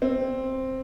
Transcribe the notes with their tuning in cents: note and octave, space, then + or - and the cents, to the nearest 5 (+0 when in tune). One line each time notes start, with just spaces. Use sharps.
C4 +5